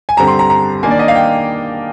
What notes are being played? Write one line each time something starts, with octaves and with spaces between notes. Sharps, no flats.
G#5
G2 D3 G3 C4 A#5
C6
A#5
A#5
D#3 A#3 D4 G#5
D5
D#5
F5
G5